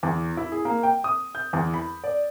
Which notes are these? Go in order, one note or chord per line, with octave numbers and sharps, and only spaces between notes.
E2
E4
G#4
A#3
G5
D#6
G6
E2
B5
D5